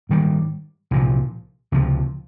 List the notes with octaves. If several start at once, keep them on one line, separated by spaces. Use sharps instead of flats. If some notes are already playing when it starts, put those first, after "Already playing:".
G#2 D#3 G3
C2 A#2 F3
C#2 C3 F3